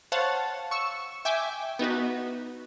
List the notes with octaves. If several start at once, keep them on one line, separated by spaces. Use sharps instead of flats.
C5 C#5 F5 F#5 A5
C#6 E6
E5 G5 G#5 D6
B3 D#4 F#4 B4